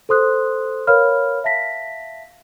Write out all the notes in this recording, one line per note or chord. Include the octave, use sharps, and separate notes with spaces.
A4 C5 C6 D#6 F#6
A#4 B4 C#5 F5 B5 F6
E5 F5 A5 A#6 B6